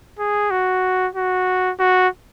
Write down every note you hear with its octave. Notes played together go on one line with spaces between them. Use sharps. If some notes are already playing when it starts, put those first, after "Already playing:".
G#4
F#4
F#4
F#4